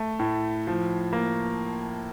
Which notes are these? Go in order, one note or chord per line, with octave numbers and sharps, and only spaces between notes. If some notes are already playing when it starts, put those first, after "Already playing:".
Already playing: A3
A2
F3
A#3